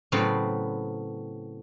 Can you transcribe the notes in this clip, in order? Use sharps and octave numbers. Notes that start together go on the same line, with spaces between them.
A2 C#3 F#3 B3 C4